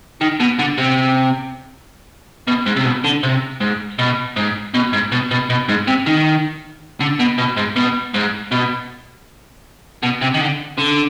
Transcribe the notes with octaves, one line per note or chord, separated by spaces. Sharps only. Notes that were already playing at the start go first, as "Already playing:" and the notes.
D#3
B2
D3
C3
B2
G#2
C3
B2
D3
C3
G#2
B2
G#2
B2
G#2
B2
B2
B2
G#2
C3
D#3
D3
B2
B2
G#2
B2
G#2
B2
B2
C3
D#3
D3
D3